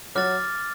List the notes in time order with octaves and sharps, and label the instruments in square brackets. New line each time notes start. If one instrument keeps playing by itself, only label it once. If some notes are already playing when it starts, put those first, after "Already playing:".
[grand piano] F#3 F#4 [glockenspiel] D6 F6 A6